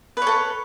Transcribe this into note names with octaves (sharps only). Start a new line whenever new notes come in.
A4 B4 C#5